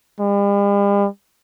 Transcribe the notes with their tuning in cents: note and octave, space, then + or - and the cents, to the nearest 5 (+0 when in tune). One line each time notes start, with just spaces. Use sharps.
G3 +45